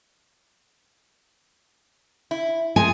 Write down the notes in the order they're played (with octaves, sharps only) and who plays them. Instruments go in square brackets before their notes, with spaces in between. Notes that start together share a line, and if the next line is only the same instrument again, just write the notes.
[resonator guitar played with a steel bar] E4
[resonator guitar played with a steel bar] F3 G#3 [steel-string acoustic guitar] G#5